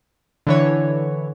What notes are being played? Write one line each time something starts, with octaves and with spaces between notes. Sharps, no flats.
D3 E3 C#5